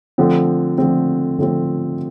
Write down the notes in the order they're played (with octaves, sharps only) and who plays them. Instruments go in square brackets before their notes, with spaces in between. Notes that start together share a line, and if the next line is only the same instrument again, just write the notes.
[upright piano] D3 F3 A3 C4
D3 F3 A3 C4
D3 F3 A3 C4